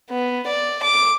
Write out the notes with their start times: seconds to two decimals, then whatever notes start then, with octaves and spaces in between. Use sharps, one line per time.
0.10 B3
0.47 D5
0.83 D6